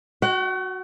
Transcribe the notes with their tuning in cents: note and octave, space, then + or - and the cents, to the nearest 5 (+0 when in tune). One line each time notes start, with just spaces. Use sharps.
F#4 +0 F#5 +45